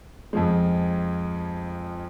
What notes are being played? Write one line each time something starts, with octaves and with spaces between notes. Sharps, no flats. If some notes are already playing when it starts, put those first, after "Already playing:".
F2 F3 G#3